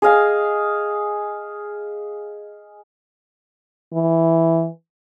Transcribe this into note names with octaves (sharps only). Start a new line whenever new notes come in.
G#4 D#5 F5 G#5
E3